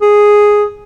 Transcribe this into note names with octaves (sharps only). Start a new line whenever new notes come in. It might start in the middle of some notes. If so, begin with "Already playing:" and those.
G#4